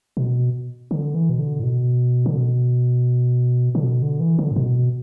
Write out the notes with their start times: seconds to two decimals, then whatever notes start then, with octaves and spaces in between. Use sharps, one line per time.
0.17 B2
0.91 D3
1.15 E3
1.29 B2
1.39 D3
1.60 A2
1.63 B2
2.26 D3
2.37 B2
3.75 D3
3.84 B2
4.02 D3
4.20 E3
4.39 D3
4.51 A2
4.56 B2